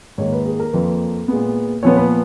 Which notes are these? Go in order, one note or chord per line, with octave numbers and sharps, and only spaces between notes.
G#2 D#3 A#3 C#5
B4
G#4
A#4
F2 F3 A#3 B4
A#2 G#3 B3
A#2 F3 B3 C#5
B4